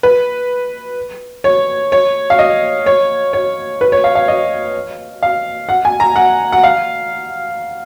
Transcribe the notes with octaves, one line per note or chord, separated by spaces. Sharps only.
B4
C#5
C#5
F5
D#5
C#5
C#5
B4
C#5
F5
F5
D#5
F5
F#5
G#5
A#5
F#5
F#5
F5